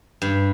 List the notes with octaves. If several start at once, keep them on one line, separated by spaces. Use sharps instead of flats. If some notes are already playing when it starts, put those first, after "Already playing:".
G2